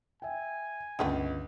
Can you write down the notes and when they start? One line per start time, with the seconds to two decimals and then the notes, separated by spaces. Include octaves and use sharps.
0.22 E5 G5 G#5
0.99 G1 C#2 D#3 A3 B3